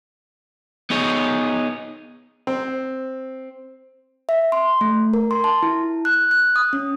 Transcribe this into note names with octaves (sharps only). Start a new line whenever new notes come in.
B3 D#4 G#4 C#5
C4
E5
C6
A3
A#4
C6
A5
E4
F#6
F#6
D#6
C#4